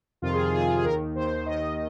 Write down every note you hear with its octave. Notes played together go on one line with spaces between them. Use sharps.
F2 C3 D#3 F4
G#4
F4
F2 C3 D#3 G#4
F4
G#4
D#2 D#3 A#4
D#2 D#3 C5
D#2 D#3 D#5